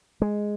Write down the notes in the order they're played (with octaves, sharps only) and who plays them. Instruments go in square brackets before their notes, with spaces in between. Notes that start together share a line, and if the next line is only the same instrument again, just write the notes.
[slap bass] G#3